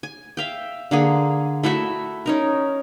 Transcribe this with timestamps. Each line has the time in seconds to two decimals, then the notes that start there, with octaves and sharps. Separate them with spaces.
0.03 G#5
0.37 E5 F5 G5
0.91 D3 A#3 G#4
1.63 A3 E4 F#4 E5
2.26 C#4 D#4 A#4